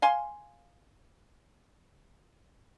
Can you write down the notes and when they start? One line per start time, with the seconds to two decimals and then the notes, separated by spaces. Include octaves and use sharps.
0.02 F5 G#5 C6